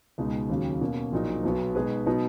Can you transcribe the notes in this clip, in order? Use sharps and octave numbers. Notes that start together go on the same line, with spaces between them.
C#2 B2 G#3 D#4
D#2 C#3 F#3
B2 A#3 C#4
A#1 A#2 F#3 A#3 D#4
B1 B2 F#3 B3
B2 G#3 D#4 G#4 B4
B2 F#3 B3 D#4